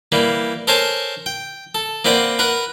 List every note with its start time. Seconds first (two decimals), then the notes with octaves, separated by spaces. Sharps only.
0.12 E3 G3 A#3
0.67 A4 A#4 C5 C#5 G#5 A5
1.26 G5
1.75 A4
2.05 A#3 C4 B4 D5 F#5
2.39 A#4 B4 F#5 B5